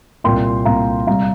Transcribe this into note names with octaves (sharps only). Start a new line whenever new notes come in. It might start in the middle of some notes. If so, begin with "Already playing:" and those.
C2 A#2 A#3 G5 C6
C2 A#2 A#3 F5 A#5
C2 C3 G3 F5 A#5